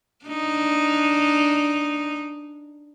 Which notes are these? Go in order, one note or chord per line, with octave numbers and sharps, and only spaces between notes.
D4 D#4